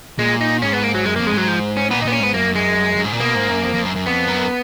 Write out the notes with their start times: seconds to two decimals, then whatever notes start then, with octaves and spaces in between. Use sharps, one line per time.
0.19 A#2 G#3
0.41 D#4
0.62 G#2 C#4
0.73 B3
0.84 A#3
0.95 F#3
1.05 F#2 G#3
1.16 F2 A#3
1.27 G#3
1.34 G#2 F#3
1.48 F3
1.77 C#4
1.91 A#2 B3
2.02 D#4
2.06 A#2 B3
2.12 C#4
2.20 G#2 B3
2.34 F#2 A#3
2.55 G#3
2.96 F#2
3.05 G#2
3.12 A#2
3.20 B2 A#3
3.35 G#2
3.49 F#2
3.63 F2
3.74 F2
3.85 F#2
3.96 F#2
4.06 F2 B3
4.27 F#2